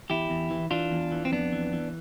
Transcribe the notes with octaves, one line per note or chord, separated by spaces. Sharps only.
E2 E4 G4
E2
E3
E3 D4 F4
E2
E3
C4
F2 B3 D4
E3
E3